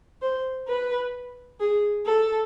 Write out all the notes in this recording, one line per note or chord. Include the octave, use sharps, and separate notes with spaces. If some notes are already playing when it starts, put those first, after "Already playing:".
C5
B4
G#4
A4